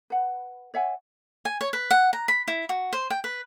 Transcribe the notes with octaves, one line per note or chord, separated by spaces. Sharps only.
B4 F#5
C#5 E5 F#5 G#5
G#5
C#5
B4
F#5
A#5
B5
E4
F#4
C5
G5
B4